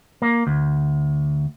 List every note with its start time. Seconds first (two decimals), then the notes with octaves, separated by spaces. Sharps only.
0.22 A#3
0.47 D2